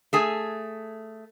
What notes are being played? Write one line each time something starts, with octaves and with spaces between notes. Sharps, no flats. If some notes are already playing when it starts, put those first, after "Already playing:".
A3 G#4 G#5